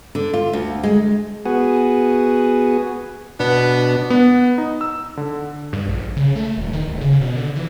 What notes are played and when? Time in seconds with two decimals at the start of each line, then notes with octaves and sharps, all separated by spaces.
0.15 D3
0.34 F4
0.53 D2
0.83 G#3
1.45 B3 F#4 G#4
3.40 B2 B3 D4
4.10 B3
4.58 D#4
4.81 E6
5.17 D3
5.73 G2
5.88 A#1
6.17 C#3
6.36 A3
6.57 D#1
6.73 D#3
6.87 D1
7.01 C#3
7.21 B2
7.36 D3
7.56 E3